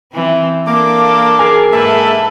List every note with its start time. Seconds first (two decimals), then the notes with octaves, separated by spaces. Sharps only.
0.13 E3 C4
0.66 A#3 D4 A4 D6
1.39 G#4 A#4 G#5
1.72 G#2 A#3 A4 B4 E5 A5